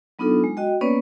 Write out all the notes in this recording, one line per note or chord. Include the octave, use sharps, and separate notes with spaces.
F#3 B3 D4 D#4 F4 A4
G#3
F#4 D#5 G5
A#3 B3 C#4 B4 C#5 D5